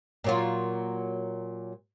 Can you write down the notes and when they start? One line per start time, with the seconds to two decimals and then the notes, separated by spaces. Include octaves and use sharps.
0.24 A#2 F#3 F4